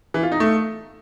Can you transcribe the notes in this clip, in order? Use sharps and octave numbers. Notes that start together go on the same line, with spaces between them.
E3
F4
D#4
A3